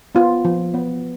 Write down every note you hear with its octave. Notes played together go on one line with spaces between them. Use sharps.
B3 F4
F3
B3